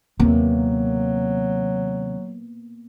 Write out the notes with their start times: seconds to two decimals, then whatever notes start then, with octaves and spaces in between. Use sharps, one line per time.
0.20 D#2 C3 F#3 A#3 B3